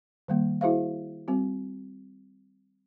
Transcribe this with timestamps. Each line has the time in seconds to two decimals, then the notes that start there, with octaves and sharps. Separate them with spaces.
0.28 D#3 G3 A#3
0.61 E4 F#4 G#4 C5 E5 F5
1.28 G3 C4 F#4